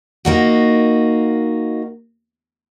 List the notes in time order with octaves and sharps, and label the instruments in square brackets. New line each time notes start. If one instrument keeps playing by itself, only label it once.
[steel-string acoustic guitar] A#3 D#4 F#4